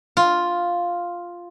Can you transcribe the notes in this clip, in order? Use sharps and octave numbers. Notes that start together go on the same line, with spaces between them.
F4